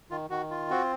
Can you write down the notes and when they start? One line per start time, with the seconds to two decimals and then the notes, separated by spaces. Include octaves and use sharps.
0.11 D#3 F4
0.30 D#3 F#4
0.51 F4
0.70 C4 F#4